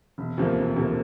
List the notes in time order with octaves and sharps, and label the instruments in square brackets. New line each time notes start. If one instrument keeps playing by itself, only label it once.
[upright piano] E1
D2 C3 F3 A#3
E1
D2 C3 F3 A#3